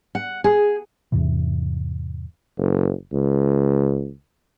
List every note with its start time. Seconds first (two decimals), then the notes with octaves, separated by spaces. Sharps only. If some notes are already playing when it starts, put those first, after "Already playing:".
0.15 F#5
0.44 G#4
1.12 E2 G#2 C3 E3
2.58 F#1
3.12 C#2